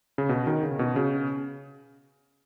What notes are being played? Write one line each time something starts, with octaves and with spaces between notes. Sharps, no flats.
C#3
B2
D#3
C#3
B2
C#3